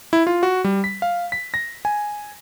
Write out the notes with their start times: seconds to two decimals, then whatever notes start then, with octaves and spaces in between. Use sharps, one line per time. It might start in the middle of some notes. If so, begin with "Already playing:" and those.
0.13 E4
0.27 F4
0.43 F#4
0.64 G3
0.84 B6
1.02 F5
1.32 B6
1.54 A#6
1.85 G#5